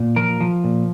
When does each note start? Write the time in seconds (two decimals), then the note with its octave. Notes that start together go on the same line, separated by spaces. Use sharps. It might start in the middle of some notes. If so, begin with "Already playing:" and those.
Already playing: A#2
0.16 F3 A#4
0.41 F3
0.64 A#2